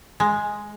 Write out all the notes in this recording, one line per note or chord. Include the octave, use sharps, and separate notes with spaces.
G#3